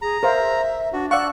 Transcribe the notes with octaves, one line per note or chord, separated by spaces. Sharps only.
G#4 A#5
A#4 C5 E5 F5
D4 F#4
D5 F5 F#5 C#6 E6 F#6